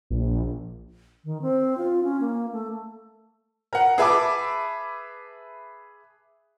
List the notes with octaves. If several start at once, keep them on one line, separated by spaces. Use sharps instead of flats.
A#1
D#3
C4
F4
C#4
A#3
A3
A#4 F#5
G#4 B4 E5 A5 B5 D6